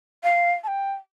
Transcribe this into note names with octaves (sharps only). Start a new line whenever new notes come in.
F5
A5
G5